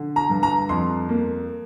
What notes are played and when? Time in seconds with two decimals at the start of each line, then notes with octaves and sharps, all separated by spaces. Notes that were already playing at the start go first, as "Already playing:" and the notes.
Already playing: D3
0.16 A#5
0.30 G2
0.43 A#5
0.69 F2 C6
1.09 A#3